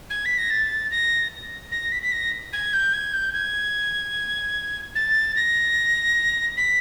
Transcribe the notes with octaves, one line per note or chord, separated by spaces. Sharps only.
G#6
B6
A#6
A6
A#6
A#6
B6
B6
A#6
G#6
G6
G#6
G6
G#6
A6
A#6
B6